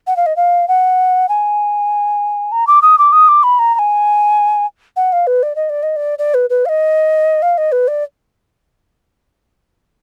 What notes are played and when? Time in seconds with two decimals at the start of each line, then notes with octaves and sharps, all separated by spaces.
0.07 F#5
0.16 F5
0.26 D#5
0.36 F5
0.68 F#5
1.29 G#5
2.52 A#5
2.67 D6
2.82 D#6
2.98 D6
3.12 D#6
3.28 D6
3.43 B5
3.59 A#5
3.74 A#5
3.79 G#5
4.96 F#5
5.12 F5
5.27 B4
5.43 D5
5.56 D#5
5.70 D5
5.83 D#5
5.96 D5
6.19 D5
6.34 B4
6.50 B4
6.65 F5
6.69 D#5
7.42 F5
7.58 D#5
7.72 B4
7.88 D5